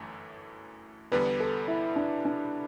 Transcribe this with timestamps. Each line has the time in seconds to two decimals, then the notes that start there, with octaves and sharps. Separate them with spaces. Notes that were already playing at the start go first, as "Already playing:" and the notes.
Already playing: G1 F#2 E3 A3
1.12 E2 D3 G3 B3 B4
1.40 A4
1.68 E4
1.96 D4
2.25 D4